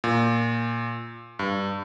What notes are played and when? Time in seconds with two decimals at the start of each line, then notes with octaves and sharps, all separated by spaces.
0.04 A#2
1.39 G2